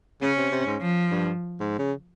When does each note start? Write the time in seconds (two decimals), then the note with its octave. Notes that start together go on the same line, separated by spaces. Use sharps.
0.22 C#3 C#4
0.38 C3
0.51 C3
0.67 G#2
0.81 F3
1.11 G2
1.60 G#2
1.79 C#3